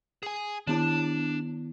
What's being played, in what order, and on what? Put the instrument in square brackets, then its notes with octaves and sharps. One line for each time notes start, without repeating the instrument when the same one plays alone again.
[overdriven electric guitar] G#4 G#5
[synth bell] D#3 B3 E4 [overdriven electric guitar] D4